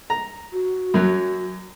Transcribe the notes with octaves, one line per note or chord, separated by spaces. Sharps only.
A#5
F#4
F#2 F#3